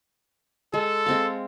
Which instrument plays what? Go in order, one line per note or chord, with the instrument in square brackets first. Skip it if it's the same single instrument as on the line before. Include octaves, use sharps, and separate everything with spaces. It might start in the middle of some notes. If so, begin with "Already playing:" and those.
[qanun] G#3 [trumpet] A4
[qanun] G#3 C4 F5